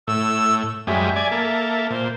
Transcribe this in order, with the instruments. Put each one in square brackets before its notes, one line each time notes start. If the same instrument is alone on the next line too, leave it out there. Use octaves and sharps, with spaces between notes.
[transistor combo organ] A2 [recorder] E6
[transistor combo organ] F#2 G3 G#3 [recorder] E5
[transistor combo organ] D5 G#5
A#3 A4
[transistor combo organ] A#2 [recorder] C5